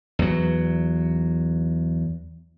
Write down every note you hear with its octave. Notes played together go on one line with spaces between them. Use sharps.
E2 F#3